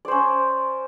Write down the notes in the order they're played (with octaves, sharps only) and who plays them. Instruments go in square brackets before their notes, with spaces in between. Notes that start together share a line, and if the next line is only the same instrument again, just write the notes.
[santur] D5
C5
C#4